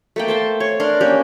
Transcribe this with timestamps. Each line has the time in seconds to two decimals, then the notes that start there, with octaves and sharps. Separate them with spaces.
0.16 A3 A#3 G5
0.28 C5 A5 C6
0.60 C#5
0.80 D4 A#4 C6
1.01 A#3 C#4 G4